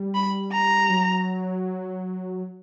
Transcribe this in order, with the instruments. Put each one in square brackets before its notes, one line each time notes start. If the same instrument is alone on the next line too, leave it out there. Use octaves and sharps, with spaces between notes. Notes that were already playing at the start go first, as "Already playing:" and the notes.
Already playing: [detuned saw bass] G3
[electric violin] B5
A#5
[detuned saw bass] F#3